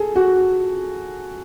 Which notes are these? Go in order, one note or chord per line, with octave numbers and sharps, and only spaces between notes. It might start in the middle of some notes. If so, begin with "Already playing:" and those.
Already playing: G#4 A4
F#4